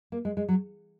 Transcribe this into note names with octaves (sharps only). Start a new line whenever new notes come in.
A#3
G#3
G#3
F#3